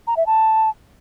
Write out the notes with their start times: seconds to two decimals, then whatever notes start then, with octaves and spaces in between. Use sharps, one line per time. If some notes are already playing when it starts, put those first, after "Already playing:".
0.07 A#5
0.17 E5
0.26 A5